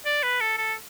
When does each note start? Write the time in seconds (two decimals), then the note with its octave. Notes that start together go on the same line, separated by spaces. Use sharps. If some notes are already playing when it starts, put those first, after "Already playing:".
0.05 D5
0.23 B4
0.40 A4
0.58 A4